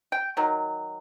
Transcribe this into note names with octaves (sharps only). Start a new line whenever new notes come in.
G5
D#3 F#3